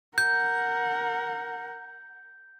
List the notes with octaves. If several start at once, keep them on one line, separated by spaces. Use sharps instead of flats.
A#4 F#5 G6